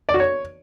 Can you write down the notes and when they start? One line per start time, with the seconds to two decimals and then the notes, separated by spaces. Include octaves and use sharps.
0.09 D5
0.14 F#4
0.20 C#5